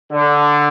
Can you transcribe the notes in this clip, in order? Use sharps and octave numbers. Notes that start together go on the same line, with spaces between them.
D3